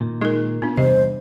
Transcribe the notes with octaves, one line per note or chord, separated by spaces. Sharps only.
A#2 D#3
G#3 D#4 A#4
A#2 B3 D4
E2 G2 C3 C5 D#5